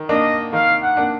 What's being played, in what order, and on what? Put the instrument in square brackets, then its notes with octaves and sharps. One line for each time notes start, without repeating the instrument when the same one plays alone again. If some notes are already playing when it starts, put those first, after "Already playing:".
Already playing: [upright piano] D#3
[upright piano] A#3 D4 [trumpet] D#5
[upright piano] D#3 [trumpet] F5
[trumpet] F#5
[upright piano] A#3 D4